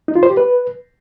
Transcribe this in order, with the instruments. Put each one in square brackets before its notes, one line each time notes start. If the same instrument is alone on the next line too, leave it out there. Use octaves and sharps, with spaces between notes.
[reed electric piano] D#4
F4
C5
G4
B4